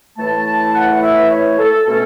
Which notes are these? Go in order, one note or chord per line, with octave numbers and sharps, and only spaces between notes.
A2 E3 A3 A5
A5
F#5
E5
C#5
A4
B2 A3 C#4 A4